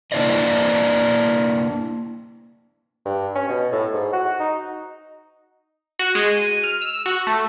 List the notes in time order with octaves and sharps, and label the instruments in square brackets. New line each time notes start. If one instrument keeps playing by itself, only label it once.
[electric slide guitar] A#3 D4 E4 C5 D5 D#5
[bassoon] G2
C#4
B2
A2
G#2
F#4
D#4
[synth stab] F#4
G#3
D#7
F6
E6
F#4
A3